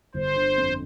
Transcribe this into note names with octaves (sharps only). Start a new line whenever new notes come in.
G1 C5
D3
F2